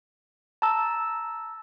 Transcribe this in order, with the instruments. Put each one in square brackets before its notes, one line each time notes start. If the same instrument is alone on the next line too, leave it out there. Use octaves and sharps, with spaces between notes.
[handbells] A5 A#5 E6